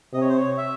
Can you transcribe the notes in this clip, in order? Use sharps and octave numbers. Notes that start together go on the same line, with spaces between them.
C3 D#5
C#5
C5
C#5
E5